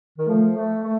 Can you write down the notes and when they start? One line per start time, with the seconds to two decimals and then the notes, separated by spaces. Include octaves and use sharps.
0.18 D#3
0.27 F3 A3
0.56 A3
0.84 A3